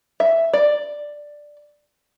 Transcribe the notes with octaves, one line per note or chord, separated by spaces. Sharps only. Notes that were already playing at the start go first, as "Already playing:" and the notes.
E5
D5